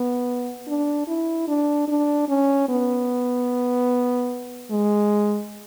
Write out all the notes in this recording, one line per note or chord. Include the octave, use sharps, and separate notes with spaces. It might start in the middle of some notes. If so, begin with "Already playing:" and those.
Already playing: B3
D4
E4
D4
D4
C#4
B3
G#3